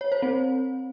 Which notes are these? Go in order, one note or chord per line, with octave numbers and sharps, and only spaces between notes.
C#5
C5
C4